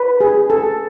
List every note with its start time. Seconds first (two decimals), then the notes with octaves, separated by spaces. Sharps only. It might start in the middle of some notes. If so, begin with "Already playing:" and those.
Already playing: B4
0.21 G#4
0.50 A4